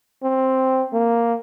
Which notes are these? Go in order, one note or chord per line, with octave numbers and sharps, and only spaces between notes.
C4
A#3